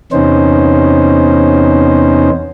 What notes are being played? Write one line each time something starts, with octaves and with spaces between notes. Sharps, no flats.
E2 C3 B3 C#4 D#4 C5